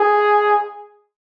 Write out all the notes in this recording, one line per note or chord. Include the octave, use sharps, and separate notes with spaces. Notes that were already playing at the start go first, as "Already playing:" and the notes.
Already playing: G#4